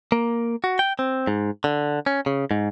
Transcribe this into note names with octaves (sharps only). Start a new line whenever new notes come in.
A#3
F#4
G5
C4
G#2
D3
C#4
C#3
G#2